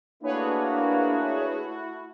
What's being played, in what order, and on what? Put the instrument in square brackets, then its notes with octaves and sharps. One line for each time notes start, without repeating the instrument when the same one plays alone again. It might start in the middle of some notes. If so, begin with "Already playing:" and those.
[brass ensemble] A3 E4 F#4 [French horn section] A#3 D4 [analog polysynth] G#4 B4 C#5